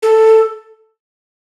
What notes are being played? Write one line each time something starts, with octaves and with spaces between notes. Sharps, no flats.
A4